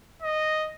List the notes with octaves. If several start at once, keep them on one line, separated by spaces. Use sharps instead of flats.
D#5